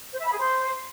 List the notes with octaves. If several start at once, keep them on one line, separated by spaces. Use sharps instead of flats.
C5
E5
B5
G#4
C5